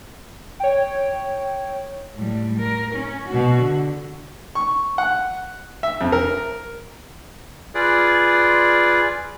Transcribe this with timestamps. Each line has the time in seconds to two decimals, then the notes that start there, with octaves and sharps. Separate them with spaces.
0.60 C#5 G5
2.16 A2 G3
2.59 A#4
2.95 C#4
3.28 B2 F#4
3.59 D3
4.55 C#6
4.98 F#5
5.83 E5
6.01 F2
6.12 A#4
7.75 F4 G#4 B4 D5